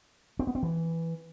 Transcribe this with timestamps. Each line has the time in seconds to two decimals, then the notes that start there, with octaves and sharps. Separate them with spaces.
0.39 C4
0.47 B3
0.55 C4
0.63 E3